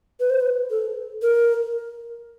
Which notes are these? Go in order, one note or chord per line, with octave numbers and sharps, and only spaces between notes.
B4
C5
B4
A4
A#4